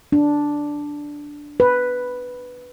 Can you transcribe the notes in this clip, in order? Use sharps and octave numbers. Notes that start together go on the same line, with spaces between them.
D4
B4